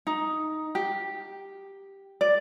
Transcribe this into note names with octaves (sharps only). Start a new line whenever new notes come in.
D#4
G4
D5